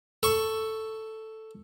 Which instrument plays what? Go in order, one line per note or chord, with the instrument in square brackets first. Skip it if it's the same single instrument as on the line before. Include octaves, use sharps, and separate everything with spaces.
[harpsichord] A4 C#6